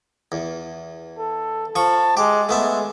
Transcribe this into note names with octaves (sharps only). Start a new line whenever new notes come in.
E2
A4
F3 A5 C#6
G#3 G4
G#3 A3 B3 E5